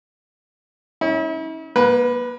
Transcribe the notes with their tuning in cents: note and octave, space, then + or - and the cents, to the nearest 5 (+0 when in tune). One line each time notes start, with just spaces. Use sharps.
C#4 +0 E4 -40
A#3 +35 B4 +0